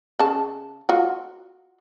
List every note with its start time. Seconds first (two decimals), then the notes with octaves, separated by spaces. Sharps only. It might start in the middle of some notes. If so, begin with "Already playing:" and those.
0.19 C#3 A5
0.89 F4 F#4